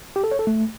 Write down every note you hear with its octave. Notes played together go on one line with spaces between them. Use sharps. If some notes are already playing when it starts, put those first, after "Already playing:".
G4
A4
C#5
A4
A3